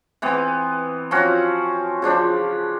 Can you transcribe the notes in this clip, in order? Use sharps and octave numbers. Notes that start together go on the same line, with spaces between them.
E3 B3 C4
F3 C4 C#4 F#4
C#3 F3 D4 C5